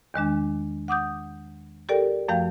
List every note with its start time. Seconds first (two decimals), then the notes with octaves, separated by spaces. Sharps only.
0.14 E2 D#3 G#3 D4
0.88 F#5 D6 D#6 G6
1.89 G4 A4 A#4 D5 G5
2.28 F#2 F3 A3 F5 G5 G6